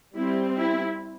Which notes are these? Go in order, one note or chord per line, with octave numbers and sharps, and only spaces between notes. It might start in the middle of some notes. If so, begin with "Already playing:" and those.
G3 C4 E4
E4